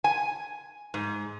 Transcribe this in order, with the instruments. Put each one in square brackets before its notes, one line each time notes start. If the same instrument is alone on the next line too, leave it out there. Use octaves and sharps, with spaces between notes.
[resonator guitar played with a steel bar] G#5
G#2